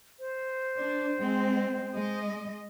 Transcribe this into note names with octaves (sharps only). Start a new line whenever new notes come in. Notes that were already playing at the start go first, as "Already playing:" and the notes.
C5
D4
G#3 C4
G#3 D#5